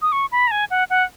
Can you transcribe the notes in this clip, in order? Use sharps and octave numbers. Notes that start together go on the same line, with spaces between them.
D#6
C#6
B5
A#5
G#5
F#5
F#5